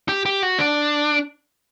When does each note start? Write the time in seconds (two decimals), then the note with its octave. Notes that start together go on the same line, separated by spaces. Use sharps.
0.09 G4
0.26 G4
0.43 F#4
0.58 D4